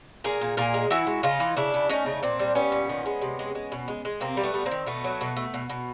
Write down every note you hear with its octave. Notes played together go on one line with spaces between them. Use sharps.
A#2 G#4 A#4
A#2
A#2 G#4 A#4
G#3
E3 E4 F#4
G#3
C#3 D#4 F4
E3
C#3 D4 E4
C#3
A3 C#4 D#4
C#3
A#2 C4 D4
G3
G3 B3 C#4
A#2
D#3
G#3
C3
G#3
G#3
B2
G#3
G#3
C3 A#3 C4
G3
A3 B3
G3
A#3 C4
D#3
B2 A3 B3
F#3
B2
A3
B2
B2